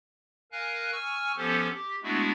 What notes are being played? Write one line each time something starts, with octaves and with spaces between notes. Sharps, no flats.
A#4 F5 G#5 F#6
G#5 C#6 E6 F6
F3 B3 C#4 G4 A4 C5
G4
G#3 A3 B3 D4 E4 F#4